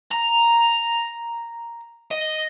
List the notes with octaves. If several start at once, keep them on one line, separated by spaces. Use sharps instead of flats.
A#5
D#5